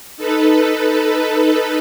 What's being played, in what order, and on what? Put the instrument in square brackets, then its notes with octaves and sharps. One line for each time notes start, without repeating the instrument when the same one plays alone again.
[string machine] D#4 A4 B4